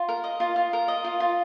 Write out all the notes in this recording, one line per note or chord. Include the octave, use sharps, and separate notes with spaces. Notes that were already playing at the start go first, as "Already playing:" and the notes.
Already playing: F4 C6
A#4
D#5
F4
F4
A#4
D#5
F4
F4